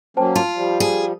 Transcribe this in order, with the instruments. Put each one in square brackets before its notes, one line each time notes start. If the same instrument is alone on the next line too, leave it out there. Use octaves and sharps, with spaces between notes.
[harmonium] F#3 A#3 C#4 [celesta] C5 G5 A5
[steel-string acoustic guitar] F4 [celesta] A5
[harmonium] F3 G3
[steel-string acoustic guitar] G#4